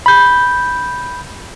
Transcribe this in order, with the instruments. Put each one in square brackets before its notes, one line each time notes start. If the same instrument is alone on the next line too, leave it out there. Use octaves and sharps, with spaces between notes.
[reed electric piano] B5 G6